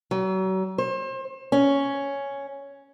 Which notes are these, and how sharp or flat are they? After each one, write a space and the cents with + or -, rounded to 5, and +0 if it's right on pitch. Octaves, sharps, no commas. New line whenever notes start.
F#3 +35
C5 +35
C#4 +5